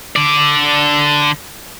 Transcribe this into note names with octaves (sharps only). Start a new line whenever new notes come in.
D3 D5